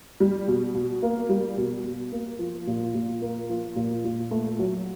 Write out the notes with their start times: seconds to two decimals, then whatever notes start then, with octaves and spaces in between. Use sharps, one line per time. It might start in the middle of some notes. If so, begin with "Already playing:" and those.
0.20 G3
0.48 B2
0.74 B2
1.02 A#3
1.29 G3
1.57 B2
1.84 B2
2.12 A#3
2.39 F3
2.67 A#2
2.95 A#2
3.22 A#3
3.49 F3
3.76 A#2
4.04 A#2
4.31 A3
4.59 F#3